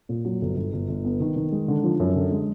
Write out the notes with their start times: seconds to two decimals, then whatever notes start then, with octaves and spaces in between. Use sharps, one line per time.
0.09 A#2
0.25 F#3
0.41 G1
0.57 G1
0.73 G1
0.89 G1
1.05 B3
1.20 D#3
1.36 D#3
1.52 G#3
1.68 D3
1.84 F3
2.00 F#2
2.15 D3
2.32 G#3